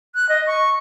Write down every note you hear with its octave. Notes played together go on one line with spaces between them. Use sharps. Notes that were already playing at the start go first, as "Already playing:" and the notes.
F#6
D#5
C#6